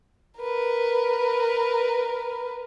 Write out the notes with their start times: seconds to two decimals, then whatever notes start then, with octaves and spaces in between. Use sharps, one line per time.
0.39 A#4 B4